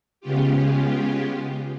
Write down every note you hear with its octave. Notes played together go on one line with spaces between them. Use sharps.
C#3 G#3 B3 C#4 F4 G4